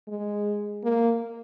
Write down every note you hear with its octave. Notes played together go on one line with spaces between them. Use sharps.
G#3
A#3